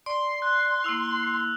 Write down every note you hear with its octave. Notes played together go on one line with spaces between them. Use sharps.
D5 C6
F#6
A#3 E4 E6 F7